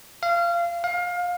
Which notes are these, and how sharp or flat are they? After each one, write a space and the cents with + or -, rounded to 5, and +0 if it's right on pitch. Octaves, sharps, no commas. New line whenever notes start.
F5 -25
F5 +25